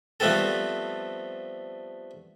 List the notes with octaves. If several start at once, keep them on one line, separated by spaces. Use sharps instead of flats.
F3 G3 A3 B3 C4 A4